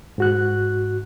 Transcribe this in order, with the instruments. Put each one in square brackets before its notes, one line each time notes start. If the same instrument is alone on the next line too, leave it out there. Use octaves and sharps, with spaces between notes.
[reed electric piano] G#2 F#4 F#6